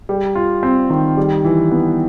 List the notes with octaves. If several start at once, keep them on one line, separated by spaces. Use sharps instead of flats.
G3
F4
C4
D#3
G3
E3
B3